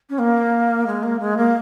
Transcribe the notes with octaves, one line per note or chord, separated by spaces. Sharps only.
C#4
A#3
G#3
A#3
G#3
A#3